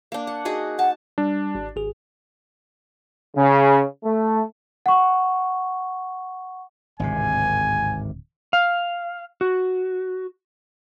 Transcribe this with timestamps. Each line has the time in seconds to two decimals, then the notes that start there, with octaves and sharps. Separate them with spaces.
0.12 A#3 D4
0.27 F#5
0.45 D#4 F#4 G#4
0.79 F#5 A5
1.18 G3 D4
1.55 G#1
1.76 G#1 G#4
3.36 C#3
4.04 A3
4.86 F#5 C#6
6.99 D1 G#1 C3 G#5
8.53 F5
9.41 F#4